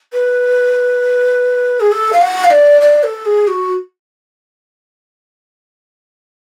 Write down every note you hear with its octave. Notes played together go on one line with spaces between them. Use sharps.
B4
G#4
A4
F5
F#5
F5
D5
D5
A4
G#4
F#4